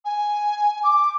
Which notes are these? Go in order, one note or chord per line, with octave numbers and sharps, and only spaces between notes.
G#5
D6